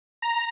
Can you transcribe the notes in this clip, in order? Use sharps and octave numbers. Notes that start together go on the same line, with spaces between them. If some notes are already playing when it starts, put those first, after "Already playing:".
A#5